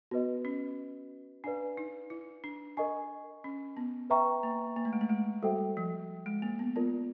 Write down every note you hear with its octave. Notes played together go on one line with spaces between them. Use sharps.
B3 F#4 B4 D#5
C#4
D4 B4 D5 F5 G#5
D#4
E4
D4
D4 A#4 D#5 G#5 C#6
C#4
B3
B4 E5 G5 A#5 C#6
A#3
A#3
A3
G#3
A3
G#3
G3 F#4 A4 C5 E5 G5
F3
G#3
A#3
B3
B3 F4 A#4 D5